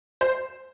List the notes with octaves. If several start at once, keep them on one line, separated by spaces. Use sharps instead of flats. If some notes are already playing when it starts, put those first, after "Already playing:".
C5